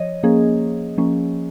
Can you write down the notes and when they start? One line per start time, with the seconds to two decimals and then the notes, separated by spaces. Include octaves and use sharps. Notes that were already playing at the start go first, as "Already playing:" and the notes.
Already playing: F3 C#5 D#5
0.23 F3 A#3 C#4 G#4
0.97 F3 A#3 C#4